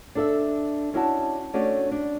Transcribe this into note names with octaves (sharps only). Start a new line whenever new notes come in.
D4 A4 E5
C#4 D4 E4 F#4 G#5 A5
A3 C#4 D4 F#4 D5
D4